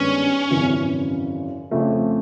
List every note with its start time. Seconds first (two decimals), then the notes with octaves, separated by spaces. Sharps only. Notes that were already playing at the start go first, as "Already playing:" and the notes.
Already playing: G#1 G2 D#3 G#3 B3 C#4
0.50 G#1 F#2 C#3 E3
1.71 F2 C#3 F3 A3